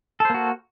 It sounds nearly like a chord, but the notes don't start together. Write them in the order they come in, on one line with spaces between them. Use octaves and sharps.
A4 C5 A#3 F#4